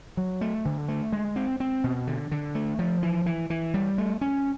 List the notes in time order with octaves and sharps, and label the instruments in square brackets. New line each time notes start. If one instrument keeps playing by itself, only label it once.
[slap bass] F#3
A3
D3
A3
G#3
C4
C4
B2
D3
D3
A3
F3
E3
E3
E3
G3
A3
C#4